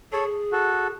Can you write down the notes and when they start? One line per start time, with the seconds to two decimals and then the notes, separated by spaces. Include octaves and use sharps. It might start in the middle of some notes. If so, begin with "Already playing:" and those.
0.12 G#4 A4 C#5
0.52 F#4 A4